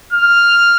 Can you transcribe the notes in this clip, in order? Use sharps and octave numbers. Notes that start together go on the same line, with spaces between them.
F6